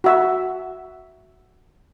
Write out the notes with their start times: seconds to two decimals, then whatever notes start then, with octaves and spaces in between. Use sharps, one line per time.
0.04 F#4 E5